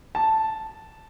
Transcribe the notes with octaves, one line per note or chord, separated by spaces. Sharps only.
A5